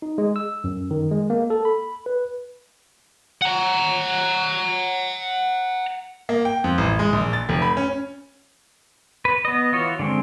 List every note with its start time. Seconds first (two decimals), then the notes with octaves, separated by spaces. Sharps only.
0.02 D#4
0.18 G#3
0.36 E6
0.64 F#2
0.91 D#3
1.11 G#3
1.30 A#3
1.50 A4
1.65 B5
2.06 B4
3.42 F#5 A#5
6.29 A#3
6.45 G5
6.64 F2
6.78 A1
6.99 G#3
7.13 A#1
7.33 A6
7.49 F1
7.62 B5
7.77 C#4
9.25 B4
9.45 B3 D#5
9.73 E3 F4 F#4 C#5
9.99 D3 G#3 C4